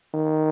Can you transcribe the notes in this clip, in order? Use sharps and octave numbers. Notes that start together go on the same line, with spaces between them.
D#3